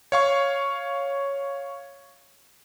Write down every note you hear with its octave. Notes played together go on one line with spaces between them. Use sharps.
C#5 F5 C#6